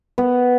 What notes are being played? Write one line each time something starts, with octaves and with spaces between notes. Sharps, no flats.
B3